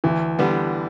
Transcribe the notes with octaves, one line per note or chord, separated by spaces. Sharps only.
D2 E3
D3 G3 B3